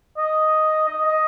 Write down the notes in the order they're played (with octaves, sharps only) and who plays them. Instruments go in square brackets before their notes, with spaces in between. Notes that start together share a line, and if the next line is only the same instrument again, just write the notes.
[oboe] D#5
D#5
D#5